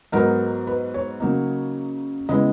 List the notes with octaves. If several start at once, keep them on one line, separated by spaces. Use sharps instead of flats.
G#2 F#3 B3 D#4 A#4
B4
C#5
C#3 F#3 A#3 D#4
C#3 G#3 B3 E4 D#5